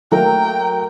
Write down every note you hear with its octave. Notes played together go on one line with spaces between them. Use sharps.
F#3 A3 A#3 A#4 G5 A#5